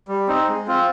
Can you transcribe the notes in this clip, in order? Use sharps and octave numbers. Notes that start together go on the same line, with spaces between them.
G3
C4 D#4
G#3
C4 F4